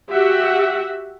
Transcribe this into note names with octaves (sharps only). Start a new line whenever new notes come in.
F#4 G4 E5 F#5